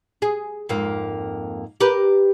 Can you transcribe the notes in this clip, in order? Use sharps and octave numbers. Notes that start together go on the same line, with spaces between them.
G#4
F2 G#2 A#3
G4 A#4 B4